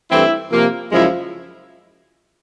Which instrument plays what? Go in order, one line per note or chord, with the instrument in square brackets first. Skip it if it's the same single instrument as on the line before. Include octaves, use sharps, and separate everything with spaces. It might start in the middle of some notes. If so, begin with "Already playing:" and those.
[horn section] G2 E3 A3 C4 E4
C3 F3 A#3
F#2 C#3 F3 G#3 E4